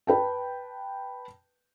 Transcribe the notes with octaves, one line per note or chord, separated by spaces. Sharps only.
B4 G5 A5